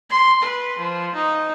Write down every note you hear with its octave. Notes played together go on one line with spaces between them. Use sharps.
C6
B4
F3
D#4